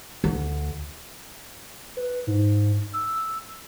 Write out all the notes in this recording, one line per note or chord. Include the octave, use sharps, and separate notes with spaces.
D2
B4
G#2
E6